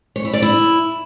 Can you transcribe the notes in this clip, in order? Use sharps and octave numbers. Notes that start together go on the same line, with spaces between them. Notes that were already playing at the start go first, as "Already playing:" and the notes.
C#5
E4
D5
E4